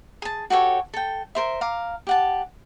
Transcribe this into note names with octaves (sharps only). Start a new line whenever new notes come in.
G#4 A5
F#4 G4 A4 C#5
A4 G5
A#4 C5 E5
F5 A#5 D6
G4 F#5 A5